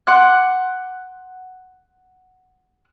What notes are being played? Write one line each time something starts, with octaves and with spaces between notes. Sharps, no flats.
F#5 C6 D6 F#6